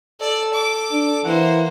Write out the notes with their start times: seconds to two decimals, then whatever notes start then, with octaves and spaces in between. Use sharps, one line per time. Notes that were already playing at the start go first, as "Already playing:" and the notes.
0.21 A4 D5
0.53 D6
0.91 D4
1.24 E3 A#3 C5 F#5